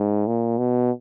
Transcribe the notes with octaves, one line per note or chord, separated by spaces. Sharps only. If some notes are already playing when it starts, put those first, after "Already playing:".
Already playing: G#2
A#2
B2